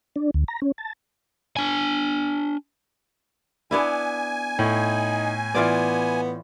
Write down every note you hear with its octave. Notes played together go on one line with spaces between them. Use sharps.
D4
D2
A#5
C#4
A5
D4 G#5
B3 D4 E4 G#5
A2 D#4
E3 B3 F4 D5